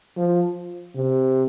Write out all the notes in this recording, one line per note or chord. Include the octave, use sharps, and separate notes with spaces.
F3
C3